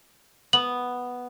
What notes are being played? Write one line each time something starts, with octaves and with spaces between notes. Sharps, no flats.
B3 F#7